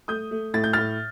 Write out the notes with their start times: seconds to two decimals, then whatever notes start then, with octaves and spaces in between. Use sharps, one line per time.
0.08 A3 D#6 G6
0.31 A3
0.54 A2 A6
0.64 G6
0.73 F6 A6
0.77 A2